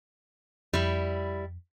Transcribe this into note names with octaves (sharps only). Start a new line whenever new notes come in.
F2 G3 E4